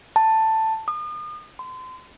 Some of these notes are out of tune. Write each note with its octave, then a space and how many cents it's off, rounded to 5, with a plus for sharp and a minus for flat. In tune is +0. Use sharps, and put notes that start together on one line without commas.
A5 +10
D#6 -40
C6 -35